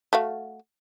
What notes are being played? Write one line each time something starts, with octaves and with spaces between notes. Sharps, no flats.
A3 F#4 F5